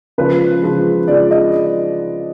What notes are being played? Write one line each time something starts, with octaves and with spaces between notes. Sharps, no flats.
C#3 F3 G#3 B4
C#3 F3 G#3
C#3 F3 G#3 D5
D#5